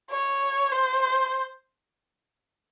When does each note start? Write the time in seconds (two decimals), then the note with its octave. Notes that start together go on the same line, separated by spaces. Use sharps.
0.10 C#5
0.72 C5